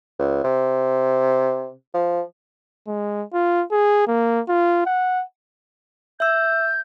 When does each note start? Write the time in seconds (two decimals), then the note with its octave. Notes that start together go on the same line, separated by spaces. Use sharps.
0.19 C#2
0.44 C3
1.94 F3
2.87 G#3
3.34 F4
3.72 G#4
4.07 A#3
4.49 F4
4.86 F#5
6.20 E5 E6 G6